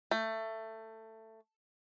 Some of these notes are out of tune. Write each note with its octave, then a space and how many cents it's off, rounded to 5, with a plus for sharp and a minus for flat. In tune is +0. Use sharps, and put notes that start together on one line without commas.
A3 +15